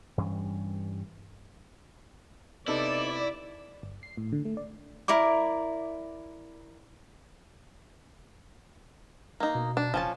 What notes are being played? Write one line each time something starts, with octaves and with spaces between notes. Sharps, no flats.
G2 E3 G3 C#4
C3 B3 D#4 E4 A4 D5
G1
C7
A2
D3
A3
D5
E4 A#4 D5 D6
A#3 D#4
B2
D4
F#1 F3 C#4 A5